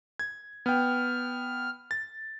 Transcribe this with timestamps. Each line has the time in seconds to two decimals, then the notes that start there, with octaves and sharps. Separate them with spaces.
0.19 G#6
0.66 B3 G5 F6
1.91 A6